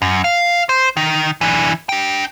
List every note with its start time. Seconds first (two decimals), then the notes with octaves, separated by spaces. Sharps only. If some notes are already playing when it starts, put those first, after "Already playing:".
0.02 F#2
0.24 F5
0.69 C5
0.97 D#3
1.41 E3 D4
1.89 D4 G5